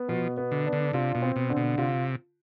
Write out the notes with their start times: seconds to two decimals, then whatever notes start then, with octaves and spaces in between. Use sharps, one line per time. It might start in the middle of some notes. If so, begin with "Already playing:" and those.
Already playing: B3
0.08 B2 F3
0.37 B3
0.51 D3
0.66 D4
0.73 D3
0.93 C3 F4
1.15 B2
1.22 C4
1.36 B2
1.50 D3
1.57 B2
1.78 C3 F4